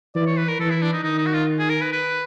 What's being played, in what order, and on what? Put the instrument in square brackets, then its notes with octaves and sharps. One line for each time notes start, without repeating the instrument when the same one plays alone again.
[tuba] E3 [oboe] D5
[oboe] C#5
B4
A#4
[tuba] E3 [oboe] A4
[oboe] E4
D4
D#4
[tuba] D#3 [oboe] D#4
[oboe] D#4
F#4
F4
G#4
A#4
B4
B4